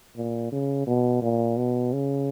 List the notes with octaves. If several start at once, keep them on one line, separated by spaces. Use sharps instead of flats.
A#2
C#3
B2
A#2
B2
C#3